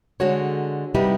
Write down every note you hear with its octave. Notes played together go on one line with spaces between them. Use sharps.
D3 G#3 F#4 A4 C#5
C3 G3 B3 D#4 E4 G4